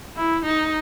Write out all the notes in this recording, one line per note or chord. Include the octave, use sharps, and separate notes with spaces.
E4
D#4